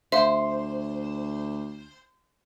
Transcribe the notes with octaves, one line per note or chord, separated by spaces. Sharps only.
D2 C5 E5 F5